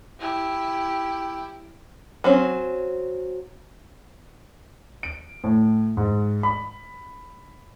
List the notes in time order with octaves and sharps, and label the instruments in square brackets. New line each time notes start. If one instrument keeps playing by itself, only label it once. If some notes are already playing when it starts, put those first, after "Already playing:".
[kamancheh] E4 G4
[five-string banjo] F#3 C4 C#4
[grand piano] D7
A2
G#2
B5